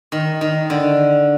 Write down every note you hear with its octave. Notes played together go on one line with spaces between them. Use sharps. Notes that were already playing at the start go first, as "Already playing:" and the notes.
D#3
D#3
D3